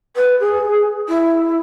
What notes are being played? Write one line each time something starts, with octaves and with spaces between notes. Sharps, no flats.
B4
G#4
E4